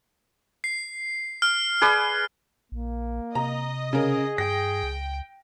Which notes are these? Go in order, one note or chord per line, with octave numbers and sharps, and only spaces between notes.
C7
F6
G#4 B4 D5
A#1 A#3
C3 D#5 A#5
C#3 G#4 A#4
G2 G5 A#6
C#2